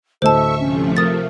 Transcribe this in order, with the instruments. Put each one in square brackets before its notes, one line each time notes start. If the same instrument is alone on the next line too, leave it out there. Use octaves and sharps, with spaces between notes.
[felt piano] D2 A2 D#5 [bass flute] A4 [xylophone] C5 A5 [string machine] E5 C#6
[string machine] C3 F3 A3 [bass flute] C#4
[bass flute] A#4 [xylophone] D#6 A6